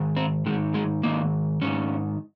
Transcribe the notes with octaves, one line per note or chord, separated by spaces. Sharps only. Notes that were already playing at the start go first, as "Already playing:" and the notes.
Already playing: G#2 D#3
C4
G#2 D#3 G#3
G#3
G#2 D#3 A#3
G#2 D#3 C#4